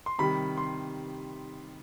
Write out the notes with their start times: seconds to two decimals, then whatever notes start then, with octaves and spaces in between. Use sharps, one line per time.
0.06 C6
0.19 C3 D#3 G3 B5
0.57 C6